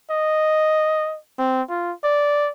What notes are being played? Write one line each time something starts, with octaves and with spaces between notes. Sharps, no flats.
D#5
C4
F4
D5